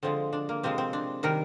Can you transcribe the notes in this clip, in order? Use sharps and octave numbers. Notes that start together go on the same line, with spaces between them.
D3 F3 G#3 C4
D4
A#3
C3 F3 G#3 C4
C4
D4
C3 D#3 G3 A#4